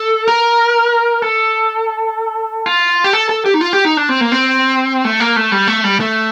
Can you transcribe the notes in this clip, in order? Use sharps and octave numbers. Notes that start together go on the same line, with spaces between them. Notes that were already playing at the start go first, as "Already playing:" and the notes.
Already playing: A4
A#4
A4
F4
G4
A4
A4
G4
D#4
F4
G4
D#4
D4
C4
A#3
C4
A3
A#3
A3
G3
A3
G3
A3